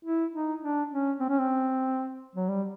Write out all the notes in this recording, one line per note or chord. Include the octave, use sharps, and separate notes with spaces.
E4
D#4
D4
C#4
C4
C#4
C4
F#3
G3